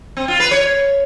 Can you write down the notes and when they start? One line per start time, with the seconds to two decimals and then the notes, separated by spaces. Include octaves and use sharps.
0.17 C4
0.28 F4
0.40 B4
0.51 C#5